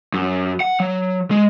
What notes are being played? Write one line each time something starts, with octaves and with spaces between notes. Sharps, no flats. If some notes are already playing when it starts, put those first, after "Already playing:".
F#2
F#5
F#3
G#3